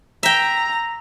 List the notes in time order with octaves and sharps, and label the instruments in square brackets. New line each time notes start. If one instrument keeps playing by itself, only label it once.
[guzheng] E5 G5 [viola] A#5